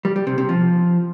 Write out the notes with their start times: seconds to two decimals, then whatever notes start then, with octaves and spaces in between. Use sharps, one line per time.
0.05 G3
0.16 G3
0.27 C3
0.38 C3
0.49 F3